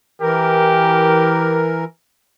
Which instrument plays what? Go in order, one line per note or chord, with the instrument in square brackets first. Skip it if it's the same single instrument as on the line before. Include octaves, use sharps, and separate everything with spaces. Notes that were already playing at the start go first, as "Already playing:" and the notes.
[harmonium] E3 A#4 [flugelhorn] G4